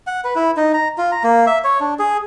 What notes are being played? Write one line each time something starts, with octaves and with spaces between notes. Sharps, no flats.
F#5
B4
E4
D#4
A#5
F4
A#5
A#3
E5
C#5
D4
G#4